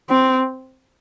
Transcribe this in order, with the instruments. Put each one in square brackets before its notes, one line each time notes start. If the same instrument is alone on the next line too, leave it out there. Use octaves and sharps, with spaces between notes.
[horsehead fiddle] C4